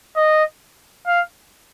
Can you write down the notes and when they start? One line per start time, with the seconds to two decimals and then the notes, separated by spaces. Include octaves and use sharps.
0.17 D#5
1.07 F5